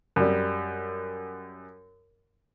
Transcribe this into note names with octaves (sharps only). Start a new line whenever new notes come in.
F#2 G3